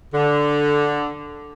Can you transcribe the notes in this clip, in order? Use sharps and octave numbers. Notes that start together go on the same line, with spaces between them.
D3